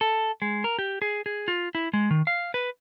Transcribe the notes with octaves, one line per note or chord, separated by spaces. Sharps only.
A4
G#3
A#4
G4
G#4
G#4
F4
E4
G#3
D#3
F5
B4